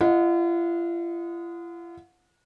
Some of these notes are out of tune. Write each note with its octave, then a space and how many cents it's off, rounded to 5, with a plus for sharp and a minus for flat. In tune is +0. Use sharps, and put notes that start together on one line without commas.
F4 -45 D#5 +0 F#5 -35